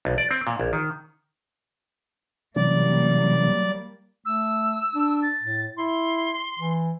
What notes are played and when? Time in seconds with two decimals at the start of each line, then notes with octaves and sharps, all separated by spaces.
0.05 B1
0.18 D5
0.31 C4
0.47 A#2
0.60 A#1
0.73 D#3
2.56 C3 E3 F#3 G3 A#3 C#4 D5
4.25 A3 E6
4.95 D4
5.22 A6
5.43 A2
5.77 E4 C6
6.59 E3